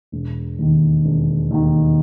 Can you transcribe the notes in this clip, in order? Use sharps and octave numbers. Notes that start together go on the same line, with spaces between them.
E1
D#2 D#3
E1
D#2 D#3